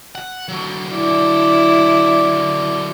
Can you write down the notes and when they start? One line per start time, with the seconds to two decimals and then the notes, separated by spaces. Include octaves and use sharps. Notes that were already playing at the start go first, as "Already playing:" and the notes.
0.15 F#5
0.48 D3 F#3
0.94 E4 D5